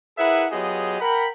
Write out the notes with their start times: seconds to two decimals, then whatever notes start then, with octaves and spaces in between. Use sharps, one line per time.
0.18 E4 G#4 A#4 B4 E5 F#5
0.52 F#3 B3 F4 G4 G#4 D#5
1.01 A#4 F#5 G5 B5